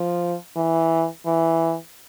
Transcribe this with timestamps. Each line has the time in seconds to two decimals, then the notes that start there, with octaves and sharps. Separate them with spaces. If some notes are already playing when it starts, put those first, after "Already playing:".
Already playing: F3
0.56 E3
1.26 E3